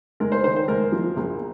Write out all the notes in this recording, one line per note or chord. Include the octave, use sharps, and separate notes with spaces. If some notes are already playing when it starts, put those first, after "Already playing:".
G#3 A#4
C5
D#3 C5
C5
G#3 A#4
F3
A#1